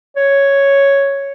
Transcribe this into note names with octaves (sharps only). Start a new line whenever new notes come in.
C#5